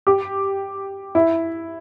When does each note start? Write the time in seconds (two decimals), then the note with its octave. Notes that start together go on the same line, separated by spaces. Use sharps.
0.07 G4
1.15 E4